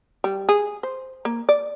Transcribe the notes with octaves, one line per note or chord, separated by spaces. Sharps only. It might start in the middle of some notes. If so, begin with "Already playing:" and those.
G3
G#4
C5
A#3
D5